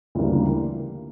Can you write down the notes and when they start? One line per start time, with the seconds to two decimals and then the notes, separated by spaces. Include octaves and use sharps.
0.15 D2 C#3 E3 G3 A#3